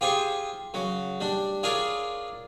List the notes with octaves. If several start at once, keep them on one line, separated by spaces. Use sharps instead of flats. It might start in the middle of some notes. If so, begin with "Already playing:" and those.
F4 G4 G#4 C5 G#5 C#6
C#3 F#3
G3 D4
D4 F4 G#4 A#4 C#5 D5